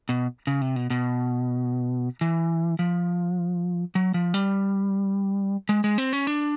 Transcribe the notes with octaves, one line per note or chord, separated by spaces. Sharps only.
B2
C#3
C3
B2
B2
E3
F3
F#3
F3
G3
G#3
G#3
C4
C#4
D4